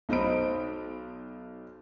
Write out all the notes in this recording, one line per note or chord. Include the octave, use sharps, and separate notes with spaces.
B1 D#4 C5 B5 D7